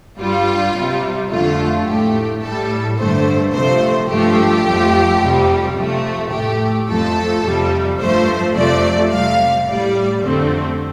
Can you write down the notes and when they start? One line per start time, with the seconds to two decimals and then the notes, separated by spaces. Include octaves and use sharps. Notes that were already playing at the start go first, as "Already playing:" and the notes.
0.19 G2 G3 F4
0.75 C3 G3
1.31 F2 D3 A3 F4
1.86 A2 A3 G4
2.43 A2 G3 A4
2.98 G2 D3 A3 C5
3.54 C3 F3 A3 C5
4.09 G2 F3 A3 G4
4.66 F2 F3 A3
5.21 F2 C3 G3
5.77 C3 F3 A3
6.32 A2 A3 G4
6.89 F2 F3 A3 A4
7.44 F2 C3 G3
8.00 G2 F3 A3 C5
8.56 F2 C3 F3 A3 D5
9.11 C3 G3 F5
9.67 A2 G3 D5
10.23 F2 D3 A3 C4